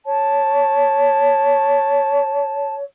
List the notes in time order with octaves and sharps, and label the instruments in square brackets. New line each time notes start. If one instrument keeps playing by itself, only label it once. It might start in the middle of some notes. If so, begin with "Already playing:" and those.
[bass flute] C#5 [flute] A5